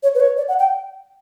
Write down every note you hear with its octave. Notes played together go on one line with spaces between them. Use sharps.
C#5
B4
C#5
D5
F#5
G5